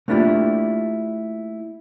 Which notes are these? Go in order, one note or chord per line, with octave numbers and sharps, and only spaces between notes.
A3 A#3 D4 E4 F4 G4